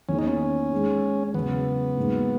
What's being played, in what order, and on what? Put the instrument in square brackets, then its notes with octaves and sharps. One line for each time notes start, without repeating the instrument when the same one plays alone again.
[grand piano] E2 D#3 A#3 [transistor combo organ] C#4
[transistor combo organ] D#4
C#4
[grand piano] G#3 D#4 G#4
[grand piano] E2 C#3 F#3 [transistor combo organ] B3
[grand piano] G#2 F#3 A#3 D#4